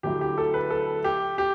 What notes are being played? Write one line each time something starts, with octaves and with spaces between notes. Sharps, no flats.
D3 F#3 A3 E4 G4
G4
A4
B4
A4
G4
G4